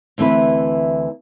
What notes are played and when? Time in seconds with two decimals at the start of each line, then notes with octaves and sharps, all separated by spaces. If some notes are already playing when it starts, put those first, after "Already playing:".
0.18 D2 E3 C4 E4 B4